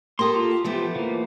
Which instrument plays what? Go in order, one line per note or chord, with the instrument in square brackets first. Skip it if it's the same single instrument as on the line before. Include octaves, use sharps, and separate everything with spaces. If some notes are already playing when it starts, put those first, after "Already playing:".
[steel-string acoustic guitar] A#3 G4 A4 [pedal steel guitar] C6 D#6
[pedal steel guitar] F4
[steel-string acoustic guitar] E3 A3 B3 [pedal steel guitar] F3 G4
[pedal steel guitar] F3 A#3